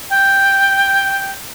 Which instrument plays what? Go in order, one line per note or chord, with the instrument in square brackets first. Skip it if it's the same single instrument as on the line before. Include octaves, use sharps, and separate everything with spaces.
[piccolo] G5